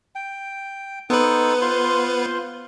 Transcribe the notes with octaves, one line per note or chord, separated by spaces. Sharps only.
G5
B3 D#4 A4 B4 C5
F4 C5 C6